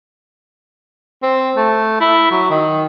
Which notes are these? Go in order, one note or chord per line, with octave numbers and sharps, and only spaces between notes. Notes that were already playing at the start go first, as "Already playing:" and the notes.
C4
A3
E4
F#3
D#3